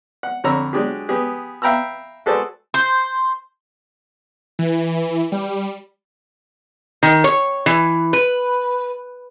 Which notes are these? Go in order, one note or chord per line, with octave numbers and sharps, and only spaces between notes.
F#5
F2 D3 C#5 A#5 B5 E6
F#3 G#3 D4 G4 G#4
B3 G4 G#4
E5 F5 G5 A#5 B5 E6
F#4 G#4 A4 B4 C5 D5
C5
E3
G3
D#3
C#5
E3
B4